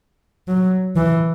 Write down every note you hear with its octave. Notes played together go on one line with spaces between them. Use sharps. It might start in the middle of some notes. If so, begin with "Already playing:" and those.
F#3
E3